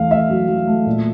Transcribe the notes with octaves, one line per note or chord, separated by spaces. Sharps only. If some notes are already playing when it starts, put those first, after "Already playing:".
Already playing: E2 A3 F5
A3 E5
F#3
F#3
A3
A#2